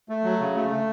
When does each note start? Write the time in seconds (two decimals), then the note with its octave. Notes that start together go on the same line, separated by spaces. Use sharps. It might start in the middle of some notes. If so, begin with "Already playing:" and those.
0.09 A3
0.24 F#3
0.40 C#3
0.55 A3
0.70 A3